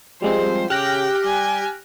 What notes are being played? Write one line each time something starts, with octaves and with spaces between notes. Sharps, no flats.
F3 G3 G#3 C4 C5
C#3 G4 G5 F6 F#6 A#6
G3 G#5